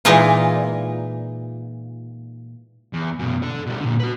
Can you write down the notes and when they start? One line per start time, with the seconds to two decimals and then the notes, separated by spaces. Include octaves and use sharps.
0.05 A#2 E3 G#3 D#4 F4
2.93 E2
3.19 F#2 B2
3.42 A4 D5
3.66 B2 G3
3.81 A#2 D3
4.00 F#4 B4